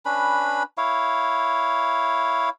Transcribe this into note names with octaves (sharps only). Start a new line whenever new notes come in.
C#4 D4 B4 B5
E4 C#5 F5